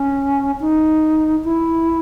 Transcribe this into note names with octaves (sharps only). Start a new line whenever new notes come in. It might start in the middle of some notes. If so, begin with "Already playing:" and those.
Already playing: C#4
D#4
E4